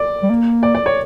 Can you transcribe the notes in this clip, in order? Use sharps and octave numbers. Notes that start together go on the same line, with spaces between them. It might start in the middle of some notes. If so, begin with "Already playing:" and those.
Already playing: D5
G3
A#3
D5
D5
C#5